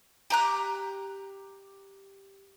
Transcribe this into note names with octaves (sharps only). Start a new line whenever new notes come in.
G4 A#5 F#6